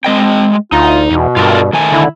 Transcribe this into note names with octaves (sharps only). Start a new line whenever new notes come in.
G#3 C4 D#5 G5
D2 D#4 F4
E2 B2
G2 F4 A4 A#4
D#3 A3 G#5
D3 E4